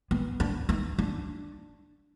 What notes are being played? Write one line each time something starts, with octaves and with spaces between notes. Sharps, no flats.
B3
D4
D#4
D4